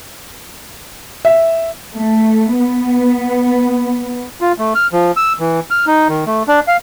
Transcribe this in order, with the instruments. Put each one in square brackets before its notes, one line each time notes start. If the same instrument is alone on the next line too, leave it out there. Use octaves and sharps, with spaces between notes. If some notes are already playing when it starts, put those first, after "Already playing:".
[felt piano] E5
[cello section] A3
B3
[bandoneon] F4
A3
F6
F3
E6
E3
F6
D#4
D#3
A3
D4
F5